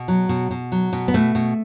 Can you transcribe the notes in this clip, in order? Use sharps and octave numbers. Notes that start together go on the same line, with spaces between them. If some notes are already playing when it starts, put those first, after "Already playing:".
Already playing: B2
F#3
B2
B2
F#3
B2
B3
B2 A3
B2